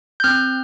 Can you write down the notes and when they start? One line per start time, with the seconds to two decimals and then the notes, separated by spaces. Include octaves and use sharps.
0.20 G6
0.24 C4 F6